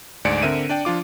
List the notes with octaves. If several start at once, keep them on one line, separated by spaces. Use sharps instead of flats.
D2 G#2 D5 G#5 C#7 D7
D3 C4 A#4 E5 D#7
D4 D5 G5
F3 D4 F4 D6